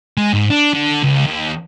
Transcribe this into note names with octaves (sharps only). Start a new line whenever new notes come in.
G#3
G#2
D4
D3
C#2
D#2